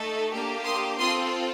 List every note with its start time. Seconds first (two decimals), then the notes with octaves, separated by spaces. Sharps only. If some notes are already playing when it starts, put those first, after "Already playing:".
Already playing: A3 D#4 A4
0.31 A#3 D4 G4
0.65 C6 D#6
0.99 C4 F4 A4 C6 D#6